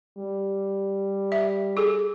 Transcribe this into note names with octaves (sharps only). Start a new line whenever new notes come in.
G3
E5
G#4 A4